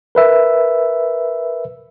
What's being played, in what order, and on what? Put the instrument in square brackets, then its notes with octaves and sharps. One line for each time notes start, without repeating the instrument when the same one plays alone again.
[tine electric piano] A#4 B4 E5